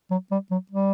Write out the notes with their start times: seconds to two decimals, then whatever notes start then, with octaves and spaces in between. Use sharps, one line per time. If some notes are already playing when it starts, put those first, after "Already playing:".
0.11 F#3
0.31 G3
0.51 F#3
0.71 G3